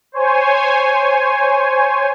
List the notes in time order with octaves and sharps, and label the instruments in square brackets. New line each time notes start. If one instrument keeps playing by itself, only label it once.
[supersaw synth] C5 C#5 G#5